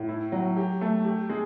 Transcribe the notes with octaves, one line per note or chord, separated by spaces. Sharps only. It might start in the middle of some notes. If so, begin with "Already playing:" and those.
Already playing: A2
E4
F#3
G4
A3
G4
G#3